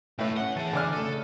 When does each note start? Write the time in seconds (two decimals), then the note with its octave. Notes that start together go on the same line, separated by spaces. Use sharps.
0.18 B1 A2 A3 B4
0.37 C#4 F#5 F#6 G7
0.56 E3 G#4 A5 A6 D#7
0.73 D3 D5 G#5 F6 F#6
0.93 C#3 A3 A4 D#7